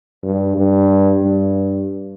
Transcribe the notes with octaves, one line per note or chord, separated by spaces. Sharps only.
G2
G2
G2